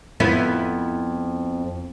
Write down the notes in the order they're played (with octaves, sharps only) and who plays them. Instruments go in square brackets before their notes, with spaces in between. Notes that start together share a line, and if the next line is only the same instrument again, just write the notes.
[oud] F2 B3 E4